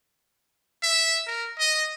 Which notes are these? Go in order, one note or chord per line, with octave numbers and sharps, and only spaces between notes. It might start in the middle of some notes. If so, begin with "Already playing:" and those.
E5
A#4
D#5